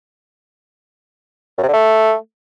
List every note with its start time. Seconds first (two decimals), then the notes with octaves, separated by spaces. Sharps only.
1.58 F#2
1.63 C3
1.68 D3
1.73 A3